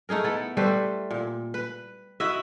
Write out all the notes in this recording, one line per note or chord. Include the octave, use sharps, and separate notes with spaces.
A3 D#4 G#4 A#4
B3 E4 A4
G3 A3 B4 C5
A#2
B4
E4 F#4 D#5 E5